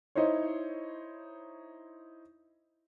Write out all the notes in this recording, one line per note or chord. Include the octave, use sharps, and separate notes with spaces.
D#4 E4 C5 C#5